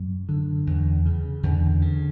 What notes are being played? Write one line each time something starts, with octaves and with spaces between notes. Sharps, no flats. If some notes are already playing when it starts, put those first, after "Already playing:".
Already playing: F#2
D3
E2
C#3
E2 D3
C#3